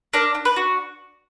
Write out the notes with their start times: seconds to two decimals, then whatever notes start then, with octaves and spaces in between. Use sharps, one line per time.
0.14 D4 A#4
0.35 D4
0.45 B4
0.56 F#4